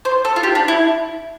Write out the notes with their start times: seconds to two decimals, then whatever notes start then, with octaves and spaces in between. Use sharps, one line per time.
0.05 C5
0.25 A4
0.36 F4
0.43 G4
0.55 D4
0.68 E4